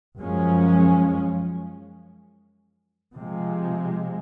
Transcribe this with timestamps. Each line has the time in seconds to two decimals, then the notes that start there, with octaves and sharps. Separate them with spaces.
0.18 F#2 F3 G#3 C#4
3.15 C3 F3 G#3